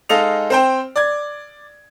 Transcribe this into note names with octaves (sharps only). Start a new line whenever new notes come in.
G#3 D#4 A4 D#5 F5 F7
C4 C5 G5
D5 G#6